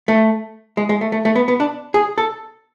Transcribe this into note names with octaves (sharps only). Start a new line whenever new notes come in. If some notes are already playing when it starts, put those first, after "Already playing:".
A3
G#3
G#3
A3
A3
A3
B3
B3
D4
G#4
A4